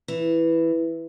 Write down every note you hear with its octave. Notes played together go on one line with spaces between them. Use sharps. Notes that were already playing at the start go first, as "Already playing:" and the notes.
E3